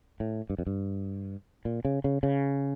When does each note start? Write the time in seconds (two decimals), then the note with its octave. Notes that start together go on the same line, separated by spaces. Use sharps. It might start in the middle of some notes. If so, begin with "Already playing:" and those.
0.20 A2
0.50 G2
0.59 F2
0.67 G2
1.65 A#2
1.85 C#3
2.04 C#3
2.23 C#3